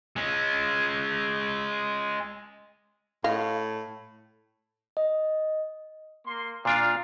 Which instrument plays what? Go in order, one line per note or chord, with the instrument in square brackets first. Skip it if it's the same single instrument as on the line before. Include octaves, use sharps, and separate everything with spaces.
[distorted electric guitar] G#3 C#4
[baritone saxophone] A2 [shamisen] D#5 F5
[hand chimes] D#5
[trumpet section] A#3 C6
[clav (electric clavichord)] A#2 D4 F4 [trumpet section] F5